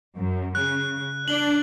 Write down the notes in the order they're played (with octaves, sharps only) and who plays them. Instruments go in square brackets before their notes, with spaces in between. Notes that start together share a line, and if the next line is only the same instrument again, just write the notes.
[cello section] F#2
[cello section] C#3 [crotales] F#6
[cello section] D4 [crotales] F#7 G7